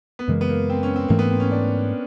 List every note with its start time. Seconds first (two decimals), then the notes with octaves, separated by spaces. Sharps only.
0.19 B3
0.28 F#2 C#3 E3 G#3 A#3
0.41 B3
0.49 A#3
0.70 C4
0.83 C#4
0.96 C4
1.08 G#2 E3 A3 A#3
1.19 B3
1.30 C4
1.40 C#4
1.52 D4